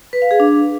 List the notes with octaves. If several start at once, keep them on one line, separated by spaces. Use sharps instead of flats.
B4
F5
G#4
D4